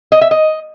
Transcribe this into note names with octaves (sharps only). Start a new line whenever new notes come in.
D#5
E5
D#5